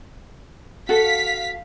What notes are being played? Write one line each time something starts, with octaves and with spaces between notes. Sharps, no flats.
F#4 A4 F5 B6